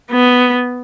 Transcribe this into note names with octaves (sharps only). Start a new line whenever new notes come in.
B3